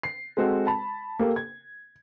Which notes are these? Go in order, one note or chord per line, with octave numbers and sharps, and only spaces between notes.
C7
G#3 C4 F#4 A4 F#5
A5 B5
A#3 G4 A4 A#4
G#6